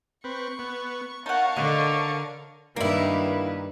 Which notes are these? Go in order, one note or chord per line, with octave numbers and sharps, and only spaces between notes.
C4 B4 C#6
B3
D#4 A#4 C#5 F5 F#5 A5 C#6
D3 D#5
G2 D#3 A#3 E4 B4